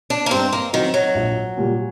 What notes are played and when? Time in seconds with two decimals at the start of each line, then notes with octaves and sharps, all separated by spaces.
0.10 D4
0.26 A#3
0.31 G2 C4
0.53 A#3
0.73 D#3 F#3 C4 D#4
0.94 F#3
1.15 A#1
1.57 A#2 G3